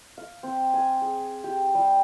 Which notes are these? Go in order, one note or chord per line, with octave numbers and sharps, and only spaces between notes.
F5
C4
G#5
G#4
G4
G3